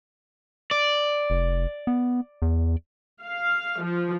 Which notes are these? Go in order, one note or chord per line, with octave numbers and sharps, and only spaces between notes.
D5
F1
B3
E2
F5
F3